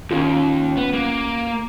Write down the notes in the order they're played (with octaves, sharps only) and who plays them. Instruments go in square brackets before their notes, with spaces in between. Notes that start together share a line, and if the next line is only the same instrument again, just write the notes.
[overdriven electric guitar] D#2 [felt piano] C#4 F4
[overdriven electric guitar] B3
A#3